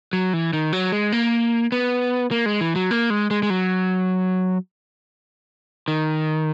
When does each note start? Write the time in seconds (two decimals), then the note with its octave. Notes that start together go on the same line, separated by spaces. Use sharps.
0.13 F#3
0.33 E3
0.53 D#3
0.73 F#3
0.92 G#3
1.12 A#3
1.72 B3
2.31 A#3
2.46 G#3
2.61 E3
2.76 F#3
2.91 A#3
3.10 G#3
3.31 G#3
3.43 G#3
3.50 F#3
5.88 D#3